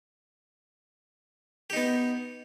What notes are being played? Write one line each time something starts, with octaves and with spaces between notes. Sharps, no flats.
B3 D#4 G4